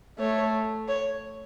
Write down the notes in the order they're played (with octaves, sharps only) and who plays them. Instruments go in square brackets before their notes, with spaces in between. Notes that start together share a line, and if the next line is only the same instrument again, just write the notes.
[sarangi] A3 [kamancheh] C#5
[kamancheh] C#5